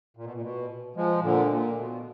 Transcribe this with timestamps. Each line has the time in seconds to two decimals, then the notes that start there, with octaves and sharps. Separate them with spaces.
0.17 A#2
0.24 B2
0.33 A#2
0.42 B2
0.96 F3 G#3
1.23 A#2 D3
1.49 A#2
1.76 B2